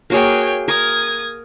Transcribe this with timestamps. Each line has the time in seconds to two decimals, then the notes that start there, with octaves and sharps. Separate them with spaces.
0.10 A#3 F#4 G#4 C#5 G5
0.68 A#4 D#6 G#6